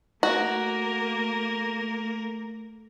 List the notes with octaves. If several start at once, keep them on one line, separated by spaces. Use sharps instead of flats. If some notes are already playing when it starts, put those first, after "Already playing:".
A3 A#3 F#4 A#4